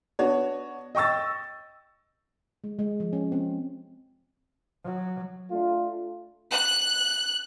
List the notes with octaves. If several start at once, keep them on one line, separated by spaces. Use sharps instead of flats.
B3 D4 F#4 C#5
D#5 G5 C#6 E6 A6
G#3
G#3
F3
C#4
C4
F#3
A3 D4 F4
F#6